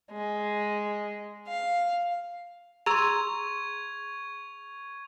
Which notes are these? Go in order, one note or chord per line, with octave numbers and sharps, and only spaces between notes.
G#3
F5
G#4 A#5 C6 C#6 E6 G#6 F7